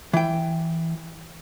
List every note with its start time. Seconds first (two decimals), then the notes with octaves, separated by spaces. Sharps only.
0.13 E3 G5